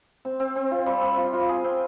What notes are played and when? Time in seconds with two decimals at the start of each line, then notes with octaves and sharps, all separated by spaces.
0.25 C4
0.40 C4
0.56 C4
0.71 F4
0.86 G3
1.02 G3
1.17 F4
1.33 F4
1.49 G#4
1.64 C4